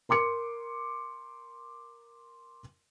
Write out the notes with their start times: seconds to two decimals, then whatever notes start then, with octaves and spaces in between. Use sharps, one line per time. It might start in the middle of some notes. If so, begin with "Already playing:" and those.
0.09 A#4 C6 D6 C#7